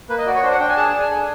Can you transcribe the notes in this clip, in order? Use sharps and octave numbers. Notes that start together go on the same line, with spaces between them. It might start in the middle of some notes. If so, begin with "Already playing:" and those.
A#3 B4
D#5
F#4 D5
C#5
D4 C5
F#5
D4 G5
G#5
G#4 A5
A5
D4
G#5
A4